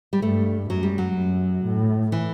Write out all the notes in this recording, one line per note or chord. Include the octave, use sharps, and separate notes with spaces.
G3
G2 A3
F#2 F#3
G3
F#3
F#2
A2
E3